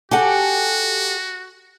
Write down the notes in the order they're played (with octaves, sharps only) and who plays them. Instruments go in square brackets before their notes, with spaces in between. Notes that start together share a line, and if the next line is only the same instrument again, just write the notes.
[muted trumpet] F#4 [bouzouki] G4 A4 F#5 [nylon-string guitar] G#5